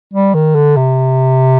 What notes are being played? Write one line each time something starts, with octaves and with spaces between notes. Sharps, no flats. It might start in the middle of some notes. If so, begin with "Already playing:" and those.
G3
D#3
D3
C3